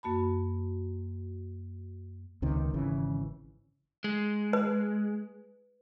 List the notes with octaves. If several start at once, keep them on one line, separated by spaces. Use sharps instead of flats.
F#2 A#3 F#4 A5 B5
C#2 C3 D#3
G#1 C#3 E3
G#3
B4